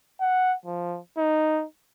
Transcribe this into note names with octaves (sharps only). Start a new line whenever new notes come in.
F#5
F3
D#4